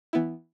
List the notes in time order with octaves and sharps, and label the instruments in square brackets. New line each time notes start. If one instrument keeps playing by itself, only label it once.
[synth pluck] E3 B3 E4